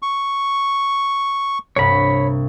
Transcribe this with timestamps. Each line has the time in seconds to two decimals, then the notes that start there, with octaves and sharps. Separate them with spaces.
0.02 C#6
1.76 C2 G2 C3 C#5 B5